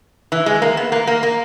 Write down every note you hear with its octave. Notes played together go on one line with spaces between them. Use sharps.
E3
G#3
A#3
B3
A#3
A#3
A#3